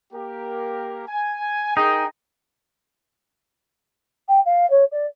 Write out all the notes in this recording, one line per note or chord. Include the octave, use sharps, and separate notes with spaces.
A#3 G4 A#4
G#5
D#4 G#4 A#4 G5
G5
F5
C#5
D5